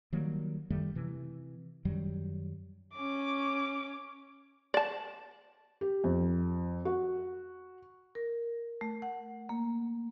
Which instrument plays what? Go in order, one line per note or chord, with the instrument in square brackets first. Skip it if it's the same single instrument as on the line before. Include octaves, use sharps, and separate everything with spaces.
[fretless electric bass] D#3 F#3 G3 A#3
F#2 D#3 G3 A3
C3 E3
F#2 D#3 F#3 G3
[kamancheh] C#4 D6
[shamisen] D5 A5
[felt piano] G4
F2
F#4
[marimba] A#4
A3
F#5
A#3